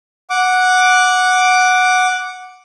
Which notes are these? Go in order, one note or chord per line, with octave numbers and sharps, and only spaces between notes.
F#5 D6